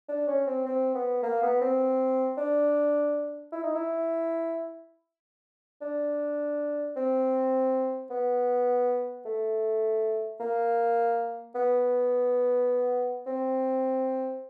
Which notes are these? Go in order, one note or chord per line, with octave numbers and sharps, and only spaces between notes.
D4
C#4
C4
C4
B3
A#3
B3
C4
D4
E4
D#4
E4
D4
C4
B3
A3
A#3
B3
C4